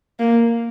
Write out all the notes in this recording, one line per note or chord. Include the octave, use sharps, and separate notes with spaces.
A#3